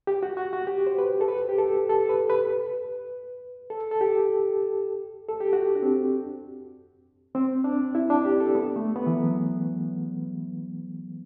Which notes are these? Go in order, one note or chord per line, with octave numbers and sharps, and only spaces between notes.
G4
F#4
F#4
F#4
G4
C5
B4
A4
B4
G4
A4
A4
B4
B4
A4
A4
G4
A4
G4
F#4
D4
C4
C4
D4
E4
D4
G4
A4
B3
A3
B3
E3
F#3